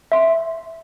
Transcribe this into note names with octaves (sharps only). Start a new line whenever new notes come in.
E5 C6